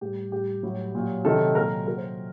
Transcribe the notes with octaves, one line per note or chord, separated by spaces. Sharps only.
A2 G3 G4
A2 G3 G4
A2 F#3
A#2 F#3
C3 D#3 F#3 A4
A#2 F#3 A#4
A#2 F#3 A#4
C5